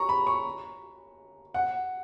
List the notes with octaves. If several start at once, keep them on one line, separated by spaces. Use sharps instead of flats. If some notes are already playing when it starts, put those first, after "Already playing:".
Already playing: A#5 C#6
B5
C#6
F#5